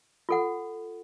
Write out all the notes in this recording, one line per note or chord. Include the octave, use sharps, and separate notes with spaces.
F4 A4 F#5